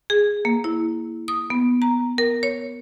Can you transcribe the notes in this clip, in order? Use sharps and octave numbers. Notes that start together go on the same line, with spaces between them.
G#4
A#3
E4
D#6
B3
A#5
A#4
C#5